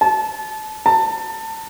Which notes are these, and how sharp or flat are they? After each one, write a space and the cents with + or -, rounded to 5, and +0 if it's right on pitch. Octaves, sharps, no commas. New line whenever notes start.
A5 -25
A5 +25